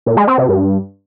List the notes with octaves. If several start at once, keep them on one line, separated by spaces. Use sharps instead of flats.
A#2
G#3
C4
C3
G2